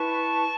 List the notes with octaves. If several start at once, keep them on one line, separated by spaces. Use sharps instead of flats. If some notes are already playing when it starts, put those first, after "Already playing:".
Already playing: E4 B4 A5 C#6